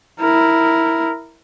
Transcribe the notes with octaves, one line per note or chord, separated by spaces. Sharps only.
E4 A#4